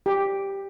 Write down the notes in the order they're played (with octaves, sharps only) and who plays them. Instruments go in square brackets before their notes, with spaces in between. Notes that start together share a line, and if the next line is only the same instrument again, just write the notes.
[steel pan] G4